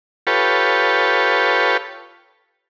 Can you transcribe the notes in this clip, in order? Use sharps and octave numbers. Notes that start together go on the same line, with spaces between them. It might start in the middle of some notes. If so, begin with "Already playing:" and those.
F4 G4 A4 B4 C#5